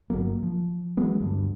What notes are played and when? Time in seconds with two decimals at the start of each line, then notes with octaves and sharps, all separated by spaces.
0.10 G1 D#2 F#3 A#3
0.43 F3
0.97 E3 F#3 G#3 B3
1.20 D2 G2